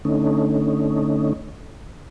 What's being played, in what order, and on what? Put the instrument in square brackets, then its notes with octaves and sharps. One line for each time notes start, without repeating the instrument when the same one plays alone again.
[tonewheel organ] D3 A3 C#4 D#4